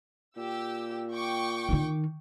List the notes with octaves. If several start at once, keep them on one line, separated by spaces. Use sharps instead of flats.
A#2 G4 E6
G5 C#6 D6
D#3 D#4